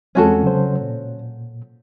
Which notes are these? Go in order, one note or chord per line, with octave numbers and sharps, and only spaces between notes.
E2 G#3 C4 C#4 F#4 A4
C#3 F#3 C5
A#2